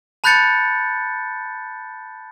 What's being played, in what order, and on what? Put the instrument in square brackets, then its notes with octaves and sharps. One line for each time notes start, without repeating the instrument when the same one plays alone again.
[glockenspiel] A5 B5 F#6 G6 A6 C#7